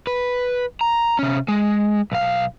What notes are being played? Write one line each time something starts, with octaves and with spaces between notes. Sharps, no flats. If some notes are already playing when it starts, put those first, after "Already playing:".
B4
A#5
C3 C#4
G#3
B1 F5